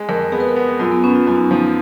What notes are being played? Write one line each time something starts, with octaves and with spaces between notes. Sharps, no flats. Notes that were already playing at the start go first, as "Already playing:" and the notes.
Already playing: G#3
F2 A#4
B3 G#4
B4
A#4
B3
F#2 F4
B3
B3 C#4
F4
F#2 F4
D#4
C#4
F3 D#4